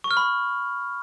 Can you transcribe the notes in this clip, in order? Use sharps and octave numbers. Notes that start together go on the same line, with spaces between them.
C#6
F6
B5